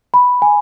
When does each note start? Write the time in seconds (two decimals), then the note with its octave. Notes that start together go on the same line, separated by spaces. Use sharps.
0.14 B5
0.42 G#5